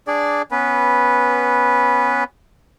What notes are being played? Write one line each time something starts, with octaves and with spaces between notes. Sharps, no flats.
D4 G#4 D5
B3 C#4 B4